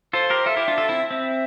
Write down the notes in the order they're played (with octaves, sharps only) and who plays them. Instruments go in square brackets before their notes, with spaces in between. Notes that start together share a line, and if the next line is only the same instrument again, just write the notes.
[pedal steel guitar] F4 A4 [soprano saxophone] C5
[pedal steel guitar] G4 A#4
[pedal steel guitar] F4 A4 [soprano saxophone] E5
[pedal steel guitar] E4 G4
D4 F4
F4 A4
C4 E4
[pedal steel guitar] C4 [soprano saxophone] E5